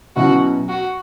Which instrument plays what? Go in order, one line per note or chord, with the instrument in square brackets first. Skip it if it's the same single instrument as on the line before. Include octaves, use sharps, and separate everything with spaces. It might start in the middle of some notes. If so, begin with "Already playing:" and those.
[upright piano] B2 F#3 C#4 E4 [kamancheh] F#4
[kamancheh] F#4